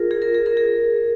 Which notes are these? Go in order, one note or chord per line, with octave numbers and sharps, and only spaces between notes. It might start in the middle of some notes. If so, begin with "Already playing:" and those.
Already playing: F4 G#4 A#4
G#4
A#4
G#4
A#4
G#4